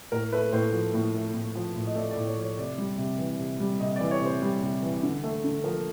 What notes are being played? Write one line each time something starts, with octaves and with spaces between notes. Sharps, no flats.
A2 A#4
A3 B4
A2 C5
F3
A2
A3
A2
F3
A2
D#5
A3 D5
D5
A2
C#5
F3
C#5
C3 D5
G3
C3
E3
C3
G3
C3 D#5
D5
E3
C#5
C3 C5
G3
C3
E3
D3
A3
D3
F3 A#4